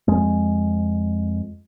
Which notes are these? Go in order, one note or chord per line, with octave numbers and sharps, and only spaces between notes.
F2 G#3